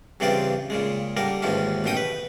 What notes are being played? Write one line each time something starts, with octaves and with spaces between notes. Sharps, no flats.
G2 C#3 E3 C4 F4 D5
A#2 C#3 G#3
D3 G3 A#3 A#4
D#2 G#2 E3 F3 C#4
A1 F#2 B2 D#4 G5 D#6
B4